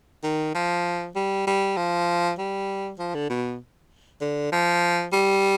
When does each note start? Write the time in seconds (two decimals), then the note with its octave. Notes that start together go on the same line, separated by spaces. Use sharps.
0.23 D#3
0.55 F3
1.16 G3
1.47 G3
1.77 F3
2.38 G3
2.99 F3
3.15 D3
3.30 B2
4.21 D3
4.52 F3
5.13 G3